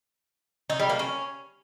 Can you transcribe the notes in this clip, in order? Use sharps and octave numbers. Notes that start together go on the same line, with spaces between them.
D#4
G3
A#3
C#4